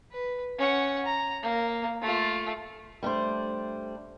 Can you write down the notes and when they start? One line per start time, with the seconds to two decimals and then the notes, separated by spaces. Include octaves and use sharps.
0.12 B4
0.58 C#4 F#5
1.05 A#5
1.43 A#3
2.02 A3 F4
3.03 G3 A3 D4 C5